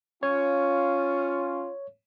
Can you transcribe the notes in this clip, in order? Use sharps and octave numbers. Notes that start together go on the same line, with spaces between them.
C#4 F4 C#5